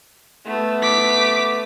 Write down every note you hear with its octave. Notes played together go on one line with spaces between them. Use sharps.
A3 B3
D6 B6